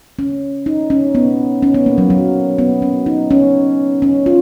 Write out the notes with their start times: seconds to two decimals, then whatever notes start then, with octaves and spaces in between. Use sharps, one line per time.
0.19 C#4
0.66 D#4
0.90 C#4
1.15 B3
1.62 C#4
1.74 B3
1.86 A#3
1.98 F#3
2.10 F#3
2.58 B3
2.82 C#4
3.06 D#4
3.31 C#4
4.02 C#4
4.26 F4